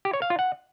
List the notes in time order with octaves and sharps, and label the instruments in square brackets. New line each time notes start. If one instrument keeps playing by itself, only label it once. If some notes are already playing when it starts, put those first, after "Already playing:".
[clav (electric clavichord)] G4
C#5
F5
F4
F#5